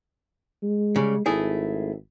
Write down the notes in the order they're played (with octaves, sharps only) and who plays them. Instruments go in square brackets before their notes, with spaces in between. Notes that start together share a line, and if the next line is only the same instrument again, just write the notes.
[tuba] G#3
[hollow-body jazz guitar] C#3 G3
[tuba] G#1 [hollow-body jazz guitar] A3 E4 G#4